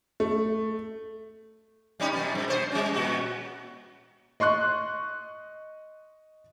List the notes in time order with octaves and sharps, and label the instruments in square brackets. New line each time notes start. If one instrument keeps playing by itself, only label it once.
[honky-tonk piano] A3
[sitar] G3 C#4 D#4
F#2 B2
G2
B2 C5
G3 C#4
A#2 F#4
[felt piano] D#5 C6 C#6 F#6